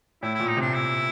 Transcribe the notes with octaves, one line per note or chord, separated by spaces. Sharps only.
A2 E4
E4
A#2
D#4
C3 D4
E4